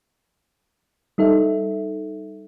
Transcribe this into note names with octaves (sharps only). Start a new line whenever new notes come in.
G3 D#4 A4 E5